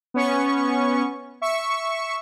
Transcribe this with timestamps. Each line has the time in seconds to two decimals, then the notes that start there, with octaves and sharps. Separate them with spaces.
0.14 B3 C#4 C#6
1.42 E5 C#6